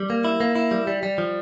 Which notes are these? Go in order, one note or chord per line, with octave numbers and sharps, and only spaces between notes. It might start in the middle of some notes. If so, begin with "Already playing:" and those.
Already playing: G3
A#3
E4
A#3
E4
G3
G3
G3
F3